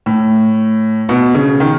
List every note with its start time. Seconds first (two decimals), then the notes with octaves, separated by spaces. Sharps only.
0.06 A2
1.09 B2
1.35 C#3
1.60 D#3